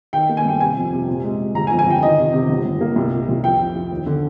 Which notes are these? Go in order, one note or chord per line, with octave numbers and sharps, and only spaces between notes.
D#3 G5
A#3
G#5
G2 G5
C3 G#5
F2
C3
A#2
G#3
A#2
G1 A#5
G#5
F2
G#5
G1 G5
D#3 D#5
C3
C3
G1
G2
A#3
C2
A#2
C2
F2 G5
F3
F3
D#2
D3